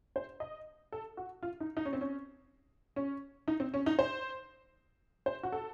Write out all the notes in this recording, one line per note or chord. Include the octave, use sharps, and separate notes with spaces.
C5
D#5
A4
F#4
F4
D#4
D#4
C#4
C4
C#4
C#4
D#4
C4
C#4
D#4
C5
C5
F#4
A4